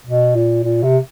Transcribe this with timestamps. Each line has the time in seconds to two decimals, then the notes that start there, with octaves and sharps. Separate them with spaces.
0.07 B2
0.36 A#2
0.64 A#2
0.83 C3